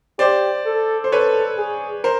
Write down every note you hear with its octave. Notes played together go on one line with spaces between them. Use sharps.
G4 C5 D5
A4
C5
A4 B4 C#5
G#4
A#4 C5